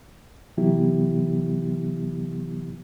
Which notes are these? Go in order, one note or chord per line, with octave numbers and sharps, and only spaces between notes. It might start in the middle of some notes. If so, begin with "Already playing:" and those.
C3 E3 F#3 B3 E4 G4